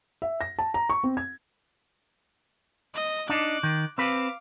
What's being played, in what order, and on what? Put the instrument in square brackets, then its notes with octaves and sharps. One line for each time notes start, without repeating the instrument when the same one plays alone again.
[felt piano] E5
A#6
A5
A#5
C#6
C4
G#6
[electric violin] D#5 A#6
[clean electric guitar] D4 D#4 [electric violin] D6 F#6
[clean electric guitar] D#3
[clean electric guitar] C4 B4 [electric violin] F5 D6